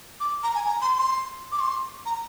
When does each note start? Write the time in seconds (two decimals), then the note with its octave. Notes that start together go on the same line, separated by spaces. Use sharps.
0.20 D6
0.43 A#5
0.55 G#5
0.66 A#5
0.82 C6
0.97 C6
1.52 D6
1.59 C6
2.05 A#5